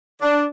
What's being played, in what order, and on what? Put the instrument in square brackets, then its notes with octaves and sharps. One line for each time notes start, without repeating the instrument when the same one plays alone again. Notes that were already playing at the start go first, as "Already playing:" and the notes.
[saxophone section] D4